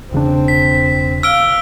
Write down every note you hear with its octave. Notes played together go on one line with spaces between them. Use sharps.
E1 C#3 C4 D4
B6
F5 E6 F6 D7 G7